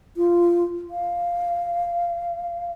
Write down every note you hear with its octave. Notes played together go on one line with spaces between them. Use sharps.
F4
F5